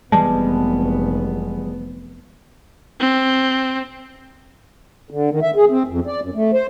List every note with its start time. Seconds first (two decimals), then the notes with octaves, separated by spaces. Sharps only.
0.12 F1 E3 G3 G#3 B3 A5
3.00 C4
5.10 D3
5.30 D#3
5.42 E5
5.56 G#4
5.69 C4
5.88 F2
6.07 D5
6.22 F#2
6.35 A3
6.53 C5